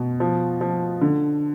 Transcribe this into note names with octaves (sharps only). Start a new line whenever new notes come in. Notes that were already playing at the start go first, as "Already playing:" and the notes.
Already playing: B2
F3
F3
D3